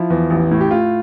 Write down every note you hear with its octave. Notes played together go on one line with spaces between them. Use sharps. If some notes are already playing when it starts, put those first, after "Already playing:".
Already playing: F3 E4
E2
A1
A2
G4
A2 F4